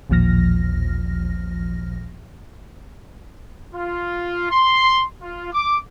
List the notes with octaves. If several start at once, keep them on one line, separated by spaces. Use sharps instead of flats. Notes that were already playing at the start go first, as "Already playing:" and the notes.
A1 D#2 A#2 F3 F6 A#6
F4
C6
F4
D6